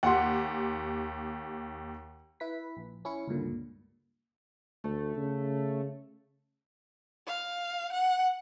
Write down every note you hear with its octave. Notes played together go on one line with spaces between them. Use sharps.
D#2 G4 F#5 C6
E4 B4 B6
A#1
C#4 E4 C#7
C#2 G2 A#2 D3
D2 A3
C#3
F5
F#5